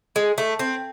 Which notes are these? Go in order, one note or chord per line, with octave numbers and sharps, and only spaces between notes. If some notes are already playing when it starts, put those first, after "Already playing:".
G#3
A3
C4